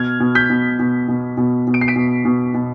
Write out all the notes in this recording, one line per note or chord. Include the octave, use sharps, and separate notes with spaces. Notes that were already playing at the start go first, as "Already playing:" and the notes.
Already playing: B2 F6 G#6
B2
G6 B6
B2
B2
B2
B2
B2
D7
C7
B6 D7
B2
B2
B2